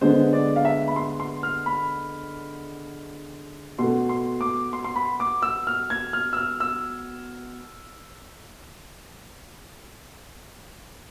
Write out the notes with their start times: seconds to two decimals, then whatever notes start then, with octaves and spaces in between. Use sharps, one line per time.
0.01 D3 G#3 B3 C5
0.33 D5
0.56 F5
0.65 E5
0.88 B5
0.96 C6
1.20 C6
1.43 F6
1.66 B5
3.78 B2 A3 C6
4.09 C6
4.41 D6
4.73 C6
4.84 C6
4.96 B5
5.20 D6
5.42 E6
5.67 F6
5.90 G#6
6.13 F6
6.33 E6
6.37 F6
6.60 E6